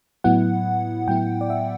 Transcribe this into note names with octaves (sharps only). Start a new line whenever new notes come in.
A2 F#3 B3 E4 F#5
A2 F#3 B3 E4 G5
D5
E5